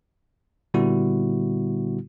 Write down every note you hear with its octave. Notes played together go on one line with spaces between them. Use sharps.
A#2 D3 G3 B3 E4 F#4